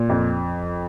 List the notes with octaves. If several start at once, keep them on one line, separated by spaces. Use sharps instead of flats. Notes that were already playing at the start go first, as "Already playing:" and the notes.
Already playing: A#2
F2